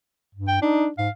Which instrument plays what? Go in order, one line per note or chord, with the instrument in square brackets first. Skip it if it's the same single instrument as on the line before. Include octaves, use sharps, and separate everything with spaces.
[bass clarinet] G2
[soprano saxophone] G5
[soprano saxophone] D4 [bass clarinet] D#4
[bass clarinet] G#2 [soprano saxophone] F5